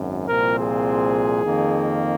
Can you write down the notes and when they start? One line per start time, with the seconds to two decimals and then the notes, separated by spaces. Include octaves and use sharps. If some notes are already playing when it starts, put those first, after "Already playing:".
Already playing: G#1 F#2
0.27 C2 A#2 F3 C4 A#4
0.57 G#4
1.45 F2 D#3 A#3